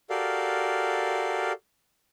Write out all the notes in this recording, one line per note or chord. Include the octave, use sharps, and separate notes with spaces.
F#4 G4 A4 A#4 D5 F5